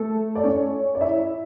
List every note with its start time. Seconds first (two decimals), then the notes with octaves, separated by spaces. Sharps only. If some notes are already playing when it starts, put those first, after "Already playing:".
Already playing: A3 A4
0.35 D5
0.43 C#4 C#5
0.95 D5
1.01 E4 E5